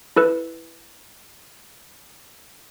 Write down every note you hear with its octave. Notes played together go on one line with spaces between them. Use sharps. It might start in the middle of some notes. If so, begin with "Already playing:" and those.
E4 A4 B4